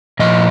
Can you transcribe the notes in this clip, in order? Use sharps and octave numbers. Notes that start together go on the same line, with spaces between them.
A#2 F3 D#5